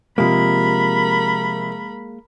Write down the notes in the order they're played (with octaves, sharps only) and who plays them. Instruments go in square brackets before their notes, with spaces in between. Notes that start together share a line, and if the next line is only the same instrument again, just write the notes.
[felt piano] C3 F3 [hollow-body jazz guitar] G#3 A#3 [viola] A#4 B5